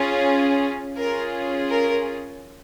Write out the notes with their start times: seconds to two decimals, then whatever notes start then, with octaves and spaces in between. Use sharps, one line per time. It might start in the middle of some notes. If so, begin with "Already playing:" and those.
Already playing: C#4 F4 G#4
0.97 C#4 F4 G#4 A#4
1.70 A#4